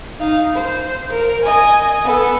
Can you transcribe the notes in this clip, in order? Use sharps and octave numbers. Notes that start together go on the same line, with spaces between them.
D#4 F5
C5
A#4
D#5 G#5
B3 A4